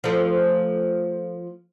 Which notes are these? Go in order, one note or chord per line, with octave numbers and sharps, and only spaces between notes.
F3 A3